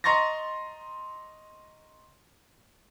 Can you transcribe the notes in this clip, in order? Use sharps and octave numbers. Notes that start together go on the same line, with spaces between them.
D#5 A#5 C6 C#6 A6 A#6